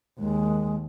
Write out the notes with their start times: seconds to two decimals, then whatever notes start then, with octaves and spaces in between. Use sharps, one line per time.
0.19 D#2 G#3